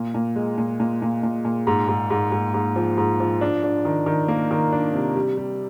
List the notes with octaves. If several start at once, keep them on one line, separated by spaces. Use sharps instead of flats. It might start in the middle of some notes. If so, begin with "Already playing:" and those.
Already playing: A#2
A#2
G#3
A#2
A#2
A#2
A#2
A#2
G#2
G#2
G#2
G#2
G#2
F3
G#2
F3
D4
D4
D#3
D#3
A#3
D#3
D4
C3
G3
G3